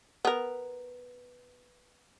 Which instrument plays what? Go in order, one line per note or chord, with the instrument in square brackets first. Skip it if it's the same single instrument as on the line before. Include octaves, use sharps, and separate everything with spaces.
[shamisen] B3 A#4